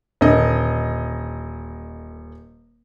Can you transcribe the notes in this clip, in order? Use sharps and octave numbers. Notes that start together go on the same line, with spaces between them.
D#1 D3 D#5